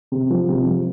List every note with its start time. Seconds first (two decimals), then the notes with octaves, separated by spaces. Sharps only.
0.12 C3
0.30 F3
0.49 C3
0.66 F3